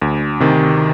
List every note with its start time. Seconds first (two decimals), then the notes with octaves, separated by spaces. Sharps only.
0.02 D2
0.40 C3 D#3